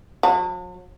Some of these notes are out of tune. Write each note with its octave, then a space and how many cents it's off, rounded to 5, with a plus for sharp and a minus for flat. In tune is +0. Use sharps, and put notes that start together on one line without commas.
F#3 -45